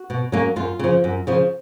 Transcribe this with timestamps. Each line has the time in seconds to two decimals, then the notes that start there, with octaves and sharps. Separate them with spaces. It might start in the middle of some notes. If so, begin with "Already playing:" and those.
Already playing: F#4
0.10 B2
0.32 F#3 A#3 C#4
0.56 F#2 F4
0.79 C#3 F3
1.04 F#2
1.27 C#3 F3